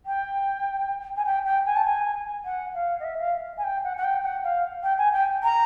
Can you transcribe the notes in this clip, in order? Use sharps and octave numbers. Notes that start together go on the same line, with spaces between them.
G5
G#5
G5
G5
G#5
A5
G#5
F#5
F5
D#5
E5
F5
G#5
G5
F#5
F#5
G5
F#5
F5
G5
G#5
G5
A#5